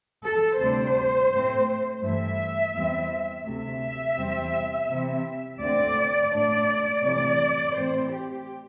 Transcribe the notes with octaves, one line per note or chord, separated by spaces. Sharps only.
A4
D2 C3 G3 D4 C5
A2 A3 C4
G2 E3 A3 E5
E2 E3 G3 C4
D2 C3 A3 E5
E2 C3 G3 C4
C3 E3 C4
D2 D3 C4 D5
A2 A3 D4 D5
C3 E3 A3 D5
A2 E3 C4 C5
G4